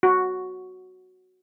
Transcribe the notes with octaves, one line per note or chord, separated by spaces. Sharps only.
F#4